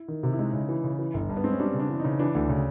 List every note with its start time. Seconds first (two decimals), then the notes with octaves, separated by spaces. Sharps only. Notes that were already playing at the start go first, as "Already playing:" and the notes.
Already playing: E4
0.08 D#3
0.23 C3
0.33 E4
0.39 G#3 D#4
0.53 C#3
0.69 E3
0.84 C#3
0.99 E3
1.14 G1
1.29 G2
1.37 B3
1.44 G#3 C4
1.52 C#4
1.59 G3 D4
1.74 C#3
1.80 D4
1.90 E3
2.00 C#3 D#4
2.19 E3 D4
2.35 D2
2.49 C#3